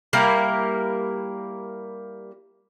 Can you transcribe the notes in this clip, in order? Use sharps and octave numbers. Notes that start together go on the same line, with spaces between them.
G3 A#3 E4 A#4